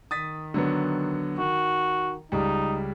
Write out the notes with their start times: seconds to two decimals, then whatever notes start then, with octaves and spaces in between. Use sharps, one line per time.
0.11 D#3 D#6 A6 B6
0.54 D3 F#3 B3
1.38 D#3 F#4
2.32 C#2 G3 D#4